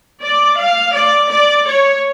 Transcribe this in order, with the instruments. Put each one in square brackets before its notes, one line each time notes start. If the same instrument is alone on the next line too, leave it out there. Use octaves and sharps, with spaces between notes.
[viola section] D5
F5
D5
D5
C#5